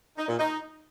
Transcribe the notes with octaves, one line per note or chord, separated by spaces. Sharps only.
D#4
A#2
D#4